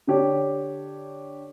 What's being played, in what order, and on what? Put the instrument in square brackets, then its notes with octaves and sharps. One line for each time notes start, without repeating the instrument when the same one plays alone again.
[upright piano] D3 D4 G4 C#5